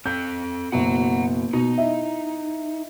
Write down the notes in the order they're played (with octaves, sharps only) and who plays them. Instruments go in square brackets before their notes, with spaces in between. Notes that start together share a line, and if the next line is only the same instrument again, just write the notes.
[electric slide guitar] C4 A4 [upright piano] G6
[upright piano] F#1 B2 [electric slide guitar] F#5 A#5
[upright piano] B2 [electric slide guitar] D#4
[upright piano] E4 D#5 E5